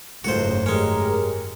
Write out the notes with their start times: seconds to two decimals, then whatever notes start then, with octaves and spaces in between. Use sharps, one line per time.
0.24 F#1 C#2 G#2 D#3 A3 F#4 C5
0.66 G#3 C#4 G4 G#4 A#4